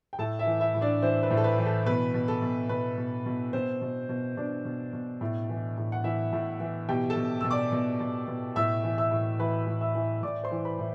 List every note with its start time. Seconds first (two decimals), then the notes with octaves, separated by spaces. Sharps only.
0.13 G5
0.19 A2 A4 A5
0.39 E4 E5
0.46 E3
0.60 E4 E5
0.74 A2
0.81 D4 D5
1.02 E3 C4 C5
1.23 B4
1.31 A2
1.37 A4
1.44 B4
1.58 E3
1.66 A4
1.86 B2 B4
2.14 B2
2.28 A4
2.42 B2
2.69 B2 B4
2.98 B2
3.26 B2
3.53 B2 C4 C5
3.82 B2
4.09 B2
4.37 B2 D4 D5
4.65 B2
4.93 B2
5.21 A2
5.49 E3
5.77 A2
5.92 F#5
6.04 E3 E4 E5
6.33 A2
6.60 E3
6.89 B2 G4 G5
7.10 A4 A5
7.17 B2
7.41 B2 E6
7.51 D5 D6
7.72 B2
8.00 B2
8.28 B2
8.56 A2 E5 E6
8.84 E3
8.98 E5 E6
9.11 A2
9.39 E3 B4 B5
9.67 A2
9.81 E5 E6
9.95 E3
10.23 A2 D5 D6
10.43 C5 C6
10.51 E3
10.65 B4 B5
10.79 A2